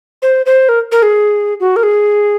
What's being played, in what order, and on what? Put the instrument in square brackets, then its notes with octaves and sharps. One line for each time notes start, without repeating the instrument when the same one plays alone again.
[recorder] C5
C5
A#4
A#4
G#4
F#4
A#4
G#4